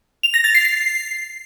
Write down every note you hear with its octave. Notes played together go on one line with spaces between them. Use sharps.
F7
A#6
A6
C7
C7